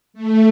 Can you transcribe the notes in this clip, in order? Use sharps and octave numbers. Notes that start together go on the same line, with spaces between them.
A3